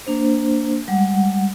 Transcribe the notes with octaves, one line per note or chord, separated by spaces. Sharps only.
A#3 D4 C5
G3 G#3 F#5